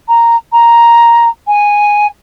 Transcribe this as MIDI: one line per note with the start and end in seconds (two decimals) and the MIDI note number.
0.08 0.36 82
0.52 1.28 82
1.47 2.07 80